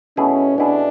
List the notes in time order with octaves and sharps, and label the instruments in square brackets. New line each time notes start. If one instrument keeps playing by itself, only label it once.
[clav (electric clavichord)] B2 A3 E4 G#4 [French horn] C#4
[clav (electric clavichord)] B2 A3 E4 G#4 [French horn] D4